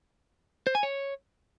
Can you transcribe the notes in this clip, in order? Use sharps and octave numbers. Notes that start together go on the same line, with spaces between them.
C5
G#5
C#5